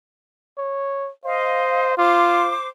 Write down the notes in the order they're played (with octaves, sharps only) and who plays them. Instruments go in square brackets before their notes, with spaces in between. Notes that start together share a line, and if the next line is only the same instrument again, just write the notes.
[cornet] C#5
[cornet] C5 [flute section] D#5 F5
[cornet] F4 [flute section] C5 D6